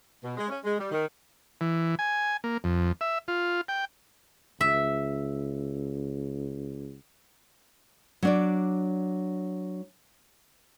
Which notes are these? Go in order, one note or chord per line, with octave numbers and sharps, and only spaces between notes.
B2
G#3
C#4
G#3
G3
D#3
E3
G#5
A#3
F2
E5
F4
G5
C#2 E5
F#3 D4 D5